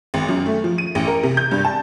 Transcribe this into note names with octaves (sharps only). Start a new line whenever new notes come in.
G#1
F#2
A3
F3
D#7
A1
A#4
C3
G6
G2
A5